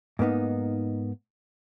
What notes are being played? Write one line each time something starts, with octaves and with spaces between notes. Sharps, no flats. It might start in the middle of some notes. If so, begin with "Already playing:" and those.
G#2 A#3 B3 D#4